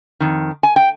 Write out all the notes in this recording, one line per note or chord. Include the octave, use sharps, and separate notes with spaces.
F2 D#3
G#5
G5